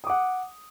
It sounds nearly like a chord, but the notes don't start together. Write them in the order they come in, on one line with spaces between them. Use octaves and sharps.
D#6 D6 F#5